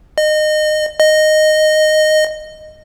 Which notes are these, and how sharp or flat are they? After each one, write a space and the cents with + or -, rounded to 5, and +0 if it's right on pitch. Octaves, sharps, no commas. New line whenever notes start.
D#5 -25
D#5 -10